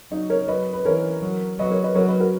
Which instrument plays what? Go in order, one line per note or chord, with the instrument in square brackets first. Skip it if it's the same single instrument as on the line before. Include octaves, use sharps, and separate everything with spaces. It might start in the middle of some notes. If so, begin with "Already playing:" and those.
[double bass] F#3 [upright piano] D#4
[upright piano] A#4 C#5
[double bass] F#3 [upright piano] B4 D#5
[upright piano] B4
[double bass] E3 [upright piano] A#4 C#5
[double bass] F#3
[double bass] F#3 [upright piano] B4 D#5
[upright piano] A#4 C#5
B4 D#5
[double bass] F#3 [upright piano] A#4 C#5
[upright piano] B4 D#5
F#4 A#4